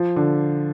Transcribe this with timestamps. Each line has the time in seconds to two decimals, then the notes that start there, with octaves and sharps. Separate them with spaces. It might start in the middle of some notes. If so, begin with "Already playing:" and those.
Already playing: F3
0.16 D3